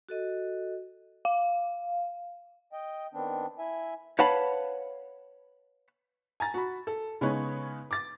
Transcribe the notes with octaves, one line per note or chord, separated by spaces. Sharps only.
F#4 A4 D#5
F5
D#5 G5
D#3 B3 C4 D4
E4 E5 G#5
B4 C#5 F5 F#5 A5 B5
G#5 A#5 A6
F#4 B5
A4
C#3 G#3 B3 D#4 B4 C#5
D6 A6